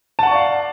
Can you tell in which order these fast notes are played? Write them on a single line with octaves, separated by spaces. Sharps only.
A5 F#5 C#6 D5 F5